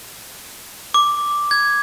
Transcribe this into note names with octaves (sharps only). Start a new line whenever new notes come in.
D6
G#6